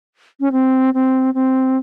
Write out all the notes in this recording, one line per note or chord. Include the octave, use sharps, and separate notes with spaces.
C#4
C4
C4
C4